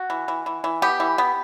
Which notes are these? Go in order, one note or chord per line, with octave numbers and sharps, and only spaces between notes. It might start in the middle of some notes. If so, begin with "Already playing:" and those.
Already playing: F#4
E3
E3
E3
E3
B3 G4
E3
B3